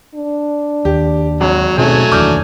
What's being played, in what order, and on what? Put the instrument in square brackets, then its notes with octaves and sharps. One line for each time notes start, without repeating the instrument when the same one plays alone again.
[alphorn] D4
[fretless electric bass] D#2 [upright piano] G4
[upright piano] G#1 [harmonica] F#3
[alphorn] G#2 [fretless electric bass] B2 C4 C#4 [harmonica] F#3 A3 G#5
[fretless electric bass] F1 D#2 E3 [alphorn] D4 [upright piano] D6 F6 G6